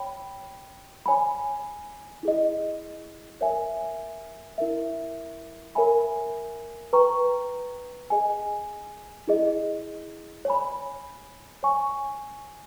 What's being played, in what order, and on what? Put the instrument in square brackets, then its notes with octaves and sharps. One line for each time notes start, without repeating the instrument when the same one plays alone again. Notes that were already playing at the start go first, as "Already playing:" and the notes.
Already playing: [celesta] C#5 G5 B5
C#5 G#5 B5
E4 G#4 D#5
A#4 C#5 E5 G#5
E4 A#4 E5
A#4 C#5 E5 G#5 B5
B4 G5 A#5 C#6
G#4 D#5 G#5
E4 G#4 D#5
C#5 G#5 B5
C#5 G#5 C#6